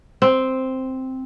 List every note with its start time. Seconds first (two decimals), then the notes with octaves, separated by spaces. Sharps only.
0.22 C4